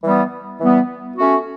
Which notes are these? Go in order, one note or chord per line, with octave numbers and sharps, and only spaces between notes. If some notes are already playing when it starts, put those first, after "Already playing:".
E3 G3 B3
E3 G3 B3
A3 C#4 F#4